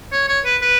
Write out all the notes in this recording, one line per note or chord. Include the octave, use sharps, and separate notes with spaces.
C#5
C#5
B4
B4